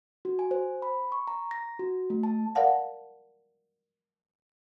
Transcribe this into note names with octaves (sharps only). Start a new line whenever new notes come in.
F#4
G#5
C5
B5
C#6
A#5
A#6
F#4
A3
A5
A#4 D5 F5 F#5 A5